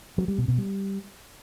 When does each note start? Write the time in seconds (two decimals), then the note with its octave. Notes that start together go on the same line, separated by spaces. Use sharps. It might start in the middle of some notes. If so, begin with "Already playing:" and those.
0.18 F#3
0.28 G3
0.38 B2
0.48 B2
0.58 G3